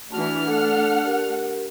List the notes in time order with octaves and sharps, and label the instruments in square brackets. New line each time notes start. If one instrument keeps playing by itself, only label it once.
[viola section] E3 F#4 [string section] A3 D4 F6 [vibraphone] A5
[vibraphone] A4 [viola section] F#5
[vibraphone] G4 A#4